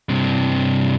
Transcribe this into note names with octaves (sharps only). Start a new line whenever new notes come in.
G2 C3